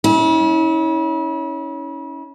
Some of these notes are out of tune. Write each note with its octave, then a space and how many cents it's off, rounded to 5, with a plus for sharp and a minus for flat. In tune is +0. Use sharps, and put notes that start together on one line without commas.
C#4 +10 E4 -40